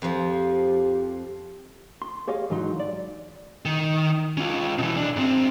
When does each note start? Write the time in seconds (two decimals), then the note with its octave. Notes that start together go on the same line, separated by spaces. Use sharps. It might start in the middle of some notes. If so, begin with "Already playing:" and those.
0.02 F2 F3 G4
2.02 C6
2.28 G4 G#4 C#5 D#5 F5
2.50 G#2 E3 F#3 D#4 C6
2.80 D5
3.65 D#3
4.37 C#4 F4
4.78 B2 E3
4.96 B1 D4
5.16 G#2 C4